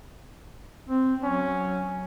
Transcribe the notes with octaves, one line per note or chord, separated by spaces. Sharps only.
C4
F#3 C#4